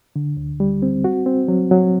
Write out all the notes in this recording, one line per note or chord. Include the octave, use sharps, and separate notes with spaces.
D3
D2
G3
C4
F#4
C4
F#3
F#3